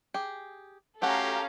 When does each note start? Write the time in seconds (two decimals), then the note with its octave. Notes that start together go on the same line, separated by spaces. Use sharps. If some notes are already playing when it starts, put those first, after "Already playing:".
0.14 G4 G#4
1.02 A3 C#4 F#4 G4 A4 F5 F#5 A#5